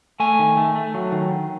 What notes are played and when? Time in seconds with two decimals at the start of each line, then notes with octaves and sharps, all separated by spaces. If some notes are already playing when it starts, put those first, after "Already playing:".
0.20 A3 G#5
0.39 D#3
0.57 A3
0.76 A3
0.94 F#3
1.12 D#3